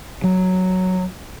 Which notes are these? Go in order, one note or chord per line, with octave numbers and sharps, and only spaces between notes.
F#3